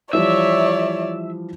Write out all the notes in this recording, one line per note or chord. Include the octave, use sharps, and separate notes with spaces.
E3 F3 G3 C#5 D5 E5